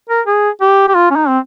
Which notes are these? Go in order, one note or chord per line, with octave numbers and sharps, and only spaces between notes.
A#4
G#4
G4
G4
F4
C#4
D#4
C4